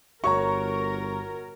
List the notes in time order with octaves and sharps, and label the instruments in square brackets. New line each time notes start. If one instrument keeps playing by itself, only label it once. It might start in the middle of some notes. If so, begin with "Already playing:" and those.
[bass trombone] G1 [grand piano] F#4 C#5 A#5 [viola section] A#4 [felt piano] C#6